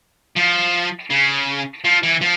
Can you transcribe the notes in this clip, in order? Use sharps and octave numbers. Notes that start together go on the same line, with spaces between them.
F3
C#3
F3
E3
F3